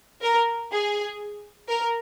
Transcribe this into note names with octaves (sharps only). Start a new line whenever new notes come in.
A#4
G#4
A#4